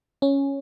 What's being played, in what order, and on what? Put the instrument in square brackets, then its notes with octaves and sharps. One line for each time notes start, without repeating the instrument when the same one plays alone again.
[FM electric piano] C#4